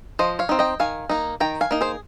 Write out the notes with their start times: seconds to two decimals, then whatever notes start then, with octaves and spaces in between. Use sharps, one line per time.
0.19 F3 C5 D#5
0.39 C#5 F5
0.49 C4 D#4
0.59 D#5 G5
0.80 D#3 F5 G#5
1.09 A#3 D#4
1.40 D#3 G5 A#5
1.61 F5 G#5
1.71 A#3 D#4
1.81 G#4 C5